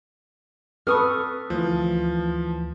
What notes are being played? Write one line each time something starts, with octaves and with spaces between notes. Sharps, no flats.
C4 A4 B4 C#6 D#6 F6
D2 E3 F3